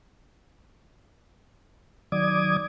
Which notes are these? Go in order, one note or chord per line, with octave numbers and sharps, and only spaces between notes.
D#3 F#3 D5 D6 D#6 G#6